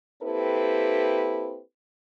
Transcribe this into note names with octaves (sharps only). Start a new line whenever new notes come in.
A#3 C4 E4 G4 A4 B4